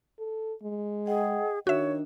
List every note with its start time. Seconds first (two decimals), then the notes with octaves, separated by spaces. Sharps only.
0.19 A4
0.63 G#3
1.07 G#4 D#5 F#5 G5
1.67 D#3 D4 F#4 C#5 E5